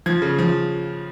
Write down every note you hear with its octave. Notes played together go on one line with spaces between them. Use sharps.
F3 G#6
C#3
F3